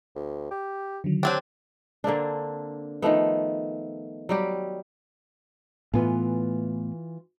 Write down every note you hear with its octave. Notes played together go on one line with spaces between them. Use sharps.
D2
G4
D3 D#3 F#3
F#3 C4 D4 G4 F#5 A5 F#6
D3 A#3 C4 D4
D#3 F3 A3 B3
F#3 G3 G4
A2 E3 B3 F4 G#5